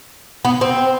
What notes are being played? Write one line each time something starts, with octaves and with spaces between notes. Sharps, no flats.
B3
C4